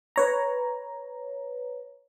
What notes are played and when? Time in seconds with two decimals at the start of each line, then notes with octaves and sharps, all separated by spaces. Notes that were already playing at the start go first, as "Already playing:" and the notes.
0.16 B4 C#5 A#5